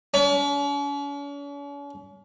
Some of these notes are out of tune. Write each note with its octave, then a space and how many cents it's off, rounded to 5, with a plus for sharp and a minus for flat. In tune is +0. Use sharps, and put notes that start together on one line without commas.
C#4 +45